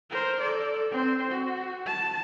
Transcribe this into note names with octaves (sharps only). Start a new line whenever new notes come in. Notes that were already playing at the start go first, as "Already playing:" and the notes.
A#4 C5
A4 D5
C4 C5
F#4
A5